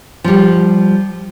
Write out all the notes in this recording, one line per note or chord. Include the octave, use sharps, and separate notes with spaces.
F3 G3